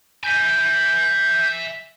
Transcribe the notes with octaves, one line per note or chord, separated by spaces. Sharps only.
E5 G#5 G6